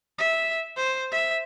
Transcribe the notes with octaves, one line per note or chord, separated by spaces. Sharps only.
E5
C5
E5